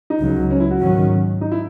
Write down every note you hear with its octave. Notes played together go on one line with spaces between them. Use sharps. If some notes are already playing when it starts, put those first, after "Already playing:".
D#4
C#2 C#3 F#3
C#4
E4
F#4
G#2 D#3 F#3 C#4
D#4
E4